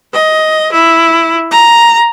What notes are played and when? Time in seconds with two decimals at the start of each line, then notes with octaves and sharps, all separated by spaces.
0.13 D#5
0.73 E4
1.51 A#5